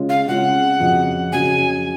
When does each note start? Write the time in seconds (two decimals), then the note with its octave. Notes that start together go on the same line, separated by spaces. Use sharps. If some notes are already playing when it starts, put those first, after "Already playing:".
Already playing: C#3 G#3 C#4 F4
0.09 F5
0.27 C#3 G#3 C#4 F4 F#5
0.80 F2 C#3 F#3
1.32 F2 C#3 F#3 G#5